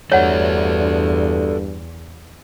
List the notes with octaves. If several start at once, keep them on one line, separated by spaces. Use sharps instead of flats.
E2 G2 F#4 A4 C#5 D5 F#5